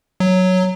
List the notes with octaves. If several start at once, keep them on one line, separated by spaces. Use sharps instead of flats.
F#3